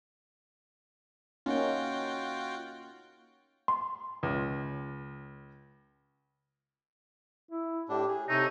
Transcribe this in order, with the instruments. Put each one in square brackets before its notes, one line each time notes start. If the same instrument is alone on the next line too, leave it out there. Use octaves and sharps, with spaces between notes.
[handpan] A#3 C#4 D#4 [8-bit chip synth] F4 F#4 G5
[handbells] C6
[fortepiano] C#2
[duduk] E4
[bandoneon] A2 D4 [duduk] G4
[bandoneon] G#4
[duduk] C3 [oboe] D#4 [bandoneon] A4 C#5 E5